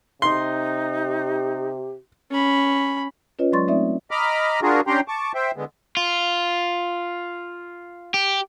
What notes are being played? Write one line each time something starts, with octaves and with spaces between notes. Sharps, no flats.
C3 D#4 C6
G4
C#4 B5
C#4 F4 B4 C#5 D#5
F#3 G#3 D5 C6 C#6 A6
A3 C4 D#4 D5 E5
D#5 A#5 B5 D6 F6
D4 F4 F#4 G#4 A#4
C#4 D4 G4 G5 A#5 C6
A5 C#6 D6
C5 E5 G5
D3 G#3 B3
F4
G4